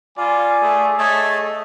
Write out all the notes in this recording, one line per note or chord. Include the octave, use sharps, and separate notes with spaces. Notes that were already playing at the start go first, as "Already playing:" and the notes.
G3 F4 D5 G#5
A3 G#4
A3 G#4 C#5 D#5 A5